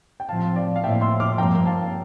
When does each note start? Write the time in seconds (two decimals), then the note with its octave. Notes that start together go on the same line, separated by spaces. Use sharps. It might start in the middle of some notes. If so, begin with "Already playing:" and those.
0.20 G5
0.29 A2 F3 C4 F5 A5
0.56 D5 F5
0.76 F5
0.84 A2 F3 A#3 E5 G5
1.01 C6 E6
1.20 D6 F6
1.38 G2 F3 A#3 G5 A#5
1.65 F5 A5